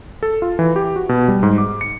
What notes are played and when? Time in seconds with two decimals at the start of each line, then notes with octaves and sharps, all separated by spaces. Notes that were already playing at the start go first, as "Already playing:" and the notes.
0.23 A4
0.42 F4
0.59 E3
0.76 G4
0.96 F#4
1.09 B2
1.28 G3
1.43 G#2
1.58 D6
1.81 C#7